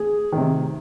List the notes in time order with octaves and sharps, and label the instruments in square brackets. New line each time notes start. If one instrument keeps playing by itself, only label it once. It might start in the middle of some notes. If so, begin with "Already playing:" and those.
Already playing: [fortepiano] G#4
C3 D#3